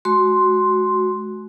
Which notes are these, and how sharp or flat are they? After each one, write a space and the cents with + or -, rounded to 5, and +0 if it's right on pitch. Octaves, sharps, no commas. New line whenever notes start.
G#3 +40 F#4 +0 C6 +0